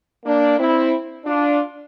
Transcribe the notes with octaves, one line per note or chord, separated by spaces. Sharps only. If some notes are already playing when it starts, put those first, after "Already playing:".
A#3 D4
C4 E4
D4 F4